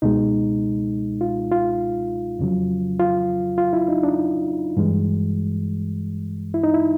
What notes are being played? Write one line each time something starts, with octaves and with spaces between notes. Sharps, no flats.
C#2 B2 G#3 D#4
F4
F4
F2 C#3 F#3
F4
F4
E4
D#4
D4
G2 E3 G#3
E4
D#4
E4